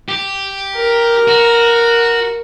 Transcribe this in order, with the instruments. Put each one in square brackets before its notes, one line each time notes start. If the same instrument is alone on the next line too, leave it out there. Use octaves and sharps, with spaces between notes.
[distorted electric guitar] G4
[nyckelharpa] A#4
[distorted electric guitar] F#4